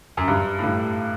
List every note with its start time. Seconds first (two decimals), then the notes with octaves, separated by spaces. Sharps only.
0.17 F#2
0.28 G2
0.59 A2
0.64 G2